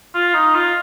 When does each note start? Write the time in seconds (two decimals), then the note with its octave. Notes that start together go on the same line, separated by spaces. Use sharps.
0.15 F4
0.34 D#4
0.55 F4